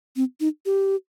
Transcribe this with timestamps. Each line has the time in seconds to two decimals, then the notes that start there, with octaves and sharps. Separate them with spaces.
0.16 C4
0.40 D#4
0.66 G4